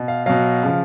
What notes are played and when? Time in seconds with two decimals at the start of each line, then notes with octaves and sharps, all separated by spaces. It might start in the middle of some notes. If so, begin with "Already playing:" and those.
Already playing: B2
0.08 F5
0.26 B2 F#3 F5
0.63 C#3 F3